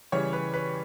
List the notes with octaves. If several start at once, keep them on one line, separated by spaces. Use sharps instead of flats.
C#3 E3 G3 C#5
B4
B4